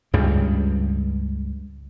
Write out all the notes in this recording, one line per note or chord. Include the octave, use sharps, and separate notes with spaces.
C#2 G2 C#3 G3